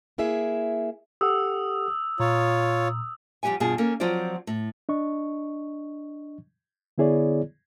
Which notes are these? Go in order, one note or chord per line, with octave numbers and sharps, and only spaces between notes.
A#3 E4 G#4 E5
G4 A4 F#5 D#6 E6
A#2 F4 C#5 A#5
F2 G3 G4 F#5 G#5
G2 B2 F4 G#4 A5
A#3 C#4 A4 A#4
F3 F#3 C4 F4 C5 D5
A2
D4 D#5 C#6
D3 B3 E4 G#4 C#5 D5